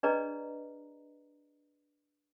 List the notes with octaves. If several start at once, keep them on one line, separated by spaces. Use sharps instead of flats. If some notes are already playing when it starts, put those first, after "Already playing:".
D4 G#4 B4 D5 D#5 A#5